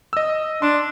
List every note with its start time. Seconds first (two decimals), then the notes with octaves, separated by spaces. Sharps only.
0.13 D#5 E6
0.62 D4 C6